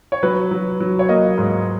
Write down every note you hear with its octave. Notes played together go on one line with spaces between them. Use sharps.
C#5
F#3 B4
F#3
F#3
C#5
A#3 D#5
G#2